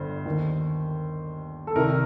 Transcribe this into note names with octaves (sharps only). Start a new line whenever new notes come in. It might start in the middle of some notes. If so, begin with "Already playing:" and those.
Already playing: G1 G2 D3 C5
D#2 D#3
A4
C2 C3 D#3 A#4